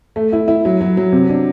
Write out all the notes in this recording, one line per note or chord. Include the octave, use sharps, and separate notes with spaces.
A3
E4
E4
F#3
F#3
F#3
C3
D4